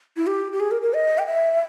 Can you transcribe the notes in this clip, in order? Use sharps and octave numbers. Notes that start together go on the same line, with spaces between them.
E4
G4
G4
G#4
A#4
A#4
D#5
G5
E5